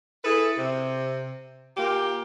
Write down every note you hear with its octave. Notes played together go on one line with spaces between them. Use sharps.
E4 G#4 A4 B4
C3
A#2 A#3 G4